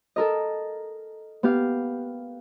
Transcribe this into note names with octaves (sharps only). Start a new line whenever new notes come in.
A4 A#4 D#5
B3 G4 F5